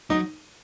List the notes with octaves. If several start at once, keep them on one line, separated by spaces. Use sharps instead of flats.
F#3 D#4